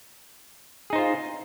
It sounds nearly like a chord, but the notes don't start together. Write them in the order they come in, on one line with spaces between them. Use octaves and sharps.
G#4 D#4 C5 F4